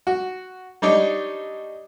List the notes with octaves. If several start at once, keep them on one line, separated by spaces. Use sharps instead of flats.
F#4
G3 D4 D#4 C#5 D5